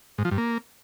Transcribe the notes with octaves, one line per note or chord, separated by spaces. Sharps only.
G#2
F3
G2
A#3